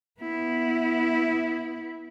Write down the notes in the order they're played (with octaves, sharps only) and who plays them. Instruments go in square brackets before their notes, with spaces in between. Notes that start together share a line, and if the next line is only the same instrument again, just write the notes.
[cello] B3 E4